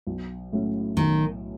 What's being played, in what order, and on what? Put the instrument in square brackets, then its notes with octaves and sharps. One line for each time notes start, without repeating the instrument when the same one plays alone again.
[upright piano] B1
A2 F#3 A3 C#4
[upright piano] B1 [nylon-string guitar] D#3